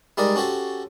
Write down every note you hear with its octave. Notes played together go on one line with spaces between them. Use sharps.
G3 G#3 D#4 A#4 D5
C#4 F#4 G4 A4 C5